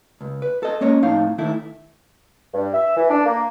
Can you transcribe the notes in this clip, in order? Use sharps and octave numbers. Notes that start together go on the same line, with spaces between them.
C#2
B4
A4 D#5
G#3 A#3 C#4 C#5 D#5
F2 A2 D#4 F5
D#3 A3 E4
G2
E5
E3
D4
A#3